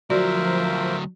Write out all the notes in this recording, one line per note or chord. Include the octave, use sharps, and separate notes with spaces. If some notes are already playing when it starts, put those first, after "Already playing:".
D2 F3 F#3 F#4 A#4 C5 D5 E5